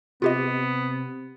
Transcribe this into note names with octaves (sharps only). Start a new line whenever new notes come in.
C3 B3 F4 G4 D#5